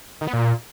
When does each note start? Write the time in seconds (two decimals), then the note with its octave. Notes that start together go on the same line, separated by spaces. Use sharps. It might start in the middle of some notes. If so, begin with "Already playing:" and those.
0.21 D#3
0.27 B3
0.33 A#2